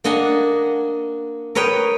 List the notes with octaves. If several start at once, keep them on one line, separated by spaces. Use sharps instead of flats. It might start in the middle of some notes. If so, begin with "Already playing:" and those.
A#3 D4 D#5 F#5 G#5
A#4 B4 C#5 D#5 G5